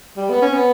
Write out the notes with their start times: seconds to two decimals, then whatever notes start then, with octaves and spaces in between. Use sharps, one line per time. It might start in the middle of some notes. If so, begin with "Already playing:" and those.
0.17 G3
0.29 B3
0.42 C#4
0.53 B3